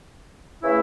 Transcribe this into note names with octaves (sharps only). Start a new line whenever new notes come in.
C#3 E3 A3 E4